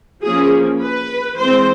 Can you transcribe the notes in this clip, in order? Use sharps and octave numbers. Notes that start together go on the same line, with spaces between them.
F3 A#3 C#4 G#4
B4
E3 G#3 C4 C5